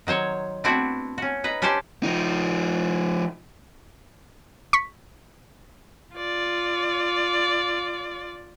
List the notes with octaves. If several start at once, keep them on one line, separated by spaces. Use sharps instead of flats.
D#3 F#3 C5 C#5
A3 B3 C4 D4 E4 F#4
C#4 F#4
D#4 B4 A#5
C#4 D4 G4 C5 D5 A5
F3 D#4
C#6 B6
F4 D5